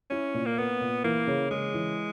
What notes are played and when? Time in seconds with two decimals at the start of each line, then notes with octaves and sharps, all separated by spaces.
0.10 C#4 E4
0.34 A#2
0.46 A#3
0.58 A#3 B3
0.81 A#2
1.04 E3 A#3
1.27 C#3
1.51 C#3 G#3
1.74 E3